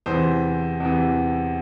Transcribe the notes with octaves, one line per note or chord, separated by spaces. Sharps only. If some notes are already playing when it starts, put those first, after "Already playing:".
E2 C3 E3 C5
E2 C3 E3